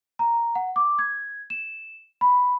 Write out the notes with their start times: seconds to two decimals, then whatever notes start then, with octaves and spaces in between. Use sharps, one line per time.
0.19 A#5
0.55 F#5
0.76 D6
0.99 G#6
1.50 E7
2.21 B5